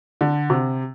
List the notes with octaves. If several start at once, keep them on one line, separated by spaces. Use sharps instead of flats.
D3
C3